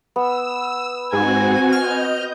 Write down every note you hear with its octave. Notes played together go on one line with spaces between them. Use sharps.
B3 E6
G#2 C4 F#4 G#5
D#5 F6 G6